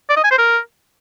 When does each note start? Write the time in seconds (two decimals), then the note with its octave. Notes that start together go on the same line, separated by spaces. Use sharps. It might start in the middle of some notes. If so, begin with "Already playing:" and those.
0.10 D5
0.17 D#5
0.24 G#5
0.31 C5
0.38 A#4